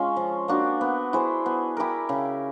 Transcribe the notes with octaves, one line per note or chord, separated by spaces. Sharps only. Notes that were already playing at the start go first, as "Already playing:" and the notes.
Already playing: G#3 C#4 F4
F3
A#3 D4 F#4
B3
E4 G#4 C5
B3
E4 G4 A#4
C#3